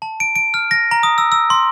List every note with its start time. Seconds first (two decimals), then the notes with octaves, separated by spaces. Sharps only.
0.02 A5
0.20 D7
0.36 D7
0.54 F6
0.71 A#6
0.91 A#5
1.03 D#6
1.18 E6
1.32 E6
1.50 C6